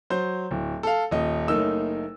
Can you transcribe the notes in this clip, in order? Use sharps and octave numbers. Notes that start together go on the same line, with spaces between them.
F#3 C5 G6
D1
A4 F5
D#1 D#5
F#1 A3 A#3 D#4 A#4 E6